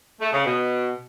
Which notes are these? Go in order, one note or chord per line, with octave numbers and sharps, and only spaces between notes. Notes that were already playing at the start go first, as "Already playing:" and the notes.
A3
C#3
B2